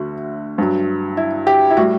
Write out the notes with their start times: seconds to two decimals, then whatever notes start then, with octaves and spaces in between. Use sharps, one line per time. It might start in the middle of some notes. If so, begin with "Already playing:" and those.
Already playing: D2 D3 F#4
0.58 G2 F#3
1.17 E4
1.47 G4
1.70 E4
1.77 A2 G3 F#4